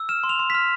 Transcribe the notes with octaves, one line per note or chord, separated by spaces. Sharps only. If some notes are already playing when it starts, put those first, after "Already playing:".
Already playing: E6
F6 E7
C6
F7
C6
F6 B6